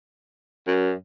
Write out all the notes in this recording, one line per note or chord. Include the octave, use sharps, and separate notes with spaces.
F#2